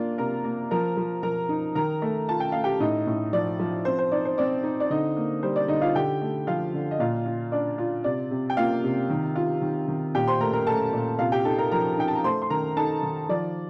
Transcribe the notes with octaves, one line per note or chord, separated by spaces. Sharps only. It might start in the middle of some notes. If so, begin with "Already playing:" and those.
Already playing: A#3 D4 F4
C3 A#4 A#5
A#3
F3 A#4 A#5
F3
F3 A#4 A#5
D#4
D#3 A#4 A#5
A3
F4 A5
G5
A3 F5
G4 G5
A2 D#4 D#5
A2
F3 D5
F3
C4 C5
C5
D#4 D5
C5
C4 D5
D#4
D5
D3 D#4 D#5
A#3
G3 C5
D5
D3 D#4 D#5
F4 F5
D3 G4 G5
A3
F3 F4 F5
D3
D#5
A#2 F4 F5
F4
D4 D5
F4
C3 D5
C3
G5
A#3 F4 F5
C3
D#3
F4
D#3
D#3
A#2 G4 G5
C5 C6
A3 A#4 A#5
A#4 A#5
A3 A4 A5
A#2
C3 F4 F5
G4 G5
D#4 A4 A5
A#4 A#5
F3 A#4 A#5
D#4 G5
A5
A#5
A3 C5 C6
C6
D#3 A#4 A#5
D#4 A4 A5
D#3
F3 D5